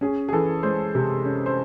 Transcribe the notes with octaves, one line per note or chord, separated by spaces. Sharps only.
C#4 G#4
G#4
E3 A4
G#3 C5
C3
C#4
C5